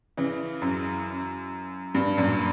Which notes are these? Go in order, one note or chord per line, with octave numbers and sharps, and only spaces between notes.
C#3 E3
F#2
G2
F#2 A#2